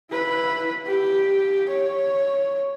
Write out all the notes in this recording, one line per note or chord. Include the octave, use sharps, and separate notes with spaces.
E4 B4
G4
C#5